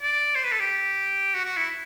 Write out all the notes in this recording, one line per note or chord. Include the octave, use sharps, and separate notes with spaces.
D5
C5
B4
A4
G4
F#4
F#4
E4